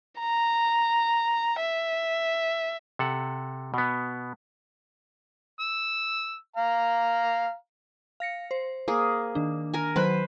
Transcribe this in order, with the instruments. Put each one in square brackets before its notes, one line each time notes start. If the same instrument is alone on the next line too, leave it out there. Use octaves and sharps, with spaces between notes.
[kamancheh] A#5
E5
[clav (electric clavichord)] C3 A4 F#5
B2 B3
[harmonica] E6
F5 A#5
[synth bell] F5 A#6 C#7
C5
[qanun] A#3 G#4
[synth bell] D#3 D4
[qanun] A#4 G#5
[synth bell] D#3 F#3 F#6 [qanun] B4 C5 B5